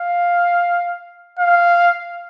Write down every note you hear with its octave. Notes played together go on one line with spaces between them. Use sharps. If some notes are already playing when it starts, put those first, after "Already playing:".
Already playing: F5
F5